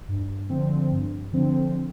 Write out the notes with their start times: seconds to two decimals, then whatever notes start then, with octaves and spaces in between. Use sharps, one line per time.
0.08 G2
0.50 D3 F3 C4
0.92 G2
1.32 D3 F3 C4